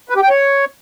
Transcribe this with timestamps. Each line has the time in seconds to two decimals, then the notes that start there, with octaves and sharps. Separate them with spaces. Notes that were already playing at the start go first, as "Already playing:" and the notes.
0.09 B4
0.16 G4
0.23 G5
0.29 C#5